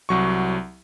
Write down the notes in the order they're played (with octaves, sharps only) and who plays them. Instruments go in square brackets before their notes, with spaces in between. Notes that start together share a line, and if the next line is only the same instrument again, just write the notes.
[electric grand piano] C2 F#3 C#6